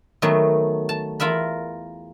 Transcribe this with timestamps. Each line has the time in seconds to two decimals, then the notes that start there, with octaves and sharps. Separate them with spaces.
0.22 D#3 F#3 A3 B3
0.89 A5
1.20 E2 F4 A#4 E5 B5